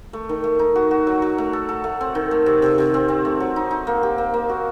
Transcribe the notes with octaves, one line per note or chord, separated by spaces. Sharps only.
A3
D#3
A3
D#4
F#4
F#4
F#3
F#3
A3
A4
A4
A3
C4
D#3
A3
C3
C3
C3
C4
C4
A3
F#3
D#4
D#4
A#3
G4
A#3
A#3
F#4